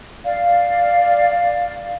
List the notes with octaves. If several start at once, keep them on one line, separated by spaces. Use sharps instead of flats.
D5 F5